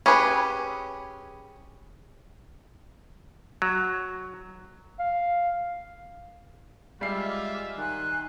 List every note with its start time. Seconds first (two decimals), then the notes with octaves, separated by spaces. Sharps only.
0.06 C#4 G4 G#4 B4
3.62 F#3
5.00 F5
7.01 G3 G#3 F4 E5 D6 C7
7.77 D#3 G#5 C6 F#6